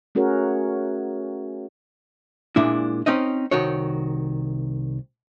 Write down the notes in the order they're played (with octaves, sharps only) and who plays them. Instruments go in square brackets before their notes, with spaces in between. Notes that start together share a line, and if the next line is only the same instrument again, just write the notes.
[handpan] A3 C#4 F#4 G#4 A#4 C#5
[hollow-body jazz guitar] A#2 G#3 D4 E4
C4 C#4 D#4 D#5
C2 D#3 F#4 C#5